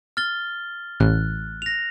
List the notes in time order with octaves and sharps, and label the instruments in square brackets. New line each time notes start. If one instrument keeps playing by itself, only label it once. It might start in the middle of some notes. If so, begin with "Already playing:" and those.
[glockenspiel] F6 A6 G7
[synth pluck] A1 [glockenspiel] F#6
[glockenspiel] A#6 F7